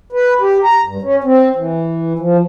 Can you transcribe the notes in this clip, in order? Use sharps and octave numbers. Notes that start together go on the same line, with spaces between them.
B4
G4
A#5
G2
C#4
C4
E3
F3